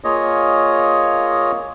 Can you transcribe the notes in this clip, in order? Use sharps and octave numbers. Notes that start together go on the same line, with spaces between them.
A#3 F4 G#4 C#5 D#5